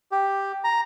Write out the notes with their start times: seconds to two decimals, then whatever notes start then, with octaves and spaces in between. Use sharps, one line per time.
0.12 G4
0.64 A#5